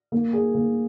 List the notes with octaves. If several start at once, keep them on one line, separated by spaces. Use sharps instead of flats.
A#3
G#4
A#3